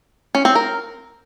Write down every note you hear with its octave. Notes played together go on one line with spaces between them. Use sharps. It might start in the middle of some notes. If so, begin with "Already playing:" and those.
C#4
C4
A#4